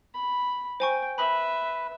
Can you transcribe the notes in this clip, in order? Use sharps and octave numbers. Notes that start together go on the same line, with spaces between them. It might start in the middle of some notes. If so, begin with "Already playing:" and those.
B5
C5 G5 G#5 C#6
B4 E5 B5 F#7